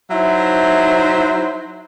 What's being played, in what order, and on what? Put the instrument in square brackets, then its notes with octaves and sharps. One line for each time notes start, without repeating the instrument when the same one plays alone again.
[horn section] F#3 D#4 E4 C5 E5